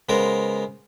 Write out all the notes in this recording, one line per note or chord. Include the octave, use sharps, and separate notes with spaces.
C#3 G#3 B3 A#4 C5